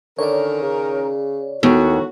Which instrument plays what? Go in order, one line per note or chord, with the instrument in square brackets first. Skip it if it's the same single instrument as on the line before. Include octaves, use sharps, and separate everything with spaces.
[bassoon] D3 [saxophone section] D#3 C#4 A#4 [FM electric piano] C#5 D5
[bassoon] C#3
[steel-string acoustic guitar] D#2 [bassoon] A2 [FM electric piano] B3 [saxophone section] F#4